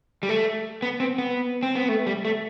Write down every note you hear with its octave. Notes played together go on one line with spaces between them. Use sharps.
G3
A3
B3
C4
B3
C4
B3
A3
G3
A3